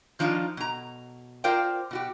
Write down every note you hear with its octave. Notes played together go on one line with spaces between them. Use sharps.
D#3 F3 D4 D#4 F4
B2 A#5
F4 A#4 C5 D5 F5 G5
B2 F#4 G4